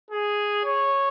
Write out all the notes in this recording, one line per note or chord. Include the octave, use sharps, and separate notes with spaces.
G#4
C#5